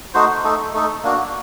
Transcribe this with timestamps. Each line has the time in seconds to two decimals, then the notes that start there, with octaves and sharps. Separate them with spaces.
0.14 A3 D#4 F#4 C5
0.44 A3 D#4 A4
0.73 A3 D#4 A4
1.04 A#3 D4 F#4